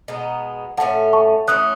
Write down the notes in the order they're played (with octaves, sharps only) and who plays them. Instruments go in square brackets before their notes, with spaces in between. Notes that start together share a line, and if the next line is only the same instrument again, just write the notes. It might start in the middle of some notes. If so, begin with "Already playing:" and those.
[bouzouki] B2 G#3 B3 D#4
[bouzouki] A2 E3 A3 C#4 [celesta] F#5 A5
[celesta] A5 C#6
[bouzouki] E3 A3 C#4 [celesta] D#6 F#6